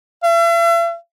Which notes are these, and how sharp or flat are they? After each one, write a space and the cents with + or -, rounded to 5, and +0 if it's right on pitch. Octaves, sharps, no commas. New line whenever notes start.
E5 +45